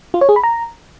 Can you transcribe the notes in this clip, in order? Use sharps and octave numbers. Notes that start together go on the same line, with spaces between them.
F4
C#5
G#4
B5
A#5